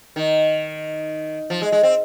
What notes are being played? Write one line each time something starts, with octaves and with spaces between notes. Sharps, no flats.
D#3
F3
G#3
G#3
C4